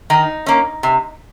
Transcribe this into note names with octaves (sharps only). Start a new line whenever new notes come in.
D#3 D#4
A#3 C#4
C3